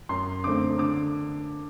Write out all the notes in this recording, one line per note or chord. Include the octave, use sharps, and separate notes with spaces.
F#2 C6
D3 A3 C4 D6
D3 D6